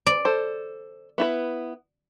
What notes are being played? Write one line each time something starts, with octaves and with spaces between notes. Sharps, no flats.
D5
A4 C5
B3 E4 B4